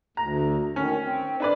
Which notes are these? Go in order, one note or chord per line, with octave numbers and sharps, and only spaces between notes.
D2 A#5
D#3 C#4
C4
D4 B4 D5